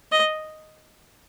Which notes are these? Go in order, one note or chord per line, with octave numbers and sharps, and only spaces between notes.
D#5